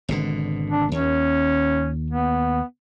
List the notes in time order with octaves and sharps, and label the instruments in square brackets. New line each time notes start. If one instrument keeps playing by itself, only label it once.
[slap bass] G#1 B2 D3
[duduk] D4
[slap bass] D#2 [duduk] C#4
[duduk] B3